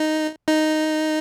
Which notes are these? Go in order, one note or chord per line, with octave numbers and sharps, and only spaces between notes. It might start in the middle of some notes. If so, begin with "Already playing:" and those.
Already playing: D#4
D#4